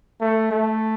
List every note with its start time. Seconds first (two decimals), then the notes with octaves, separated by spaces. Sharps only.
0.21 A3
0.51 A3